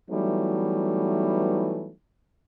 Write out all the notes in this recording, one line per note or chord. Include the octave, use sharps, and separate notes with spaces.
E3 F#3 G3 A3 B3 D#4